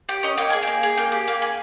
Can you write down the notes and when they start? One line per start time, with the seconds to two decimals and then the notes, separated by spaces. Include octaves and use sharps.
0.09 G4 G5
0.23 C#4 D#5
0.38 A#3 G5
0.50 G#4 G#5
0.63 A#3 G5
0.83 G#4
0.97 A#3 G5
1.12 G4
1.28 A#3
1.42 G#4